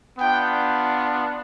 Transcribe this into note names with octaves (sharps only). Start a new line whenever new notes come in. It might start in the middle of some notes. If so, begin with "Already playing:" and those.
B3 D4 F4 G5